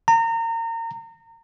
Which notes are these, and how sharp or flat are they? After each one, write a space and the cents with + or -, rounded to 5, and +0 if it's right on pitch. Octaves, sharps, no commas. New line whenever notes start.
A#5 -30